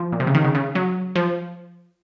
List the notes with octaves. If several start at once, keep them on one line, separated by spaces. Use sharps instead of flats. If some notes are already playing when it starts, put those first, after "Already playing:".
Already playing: F3
A#2
C3
C#3
D#3
C#3
C#3
F#3
F3